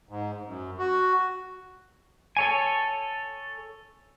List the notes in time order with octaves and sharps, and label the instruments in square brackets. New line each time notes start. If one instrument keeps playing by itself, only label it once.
[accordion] G#2
F#2
F#4
[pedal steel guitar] A4 C#5 G#5